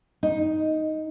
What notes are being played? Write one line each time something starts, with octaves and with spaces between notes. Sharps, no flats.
D#4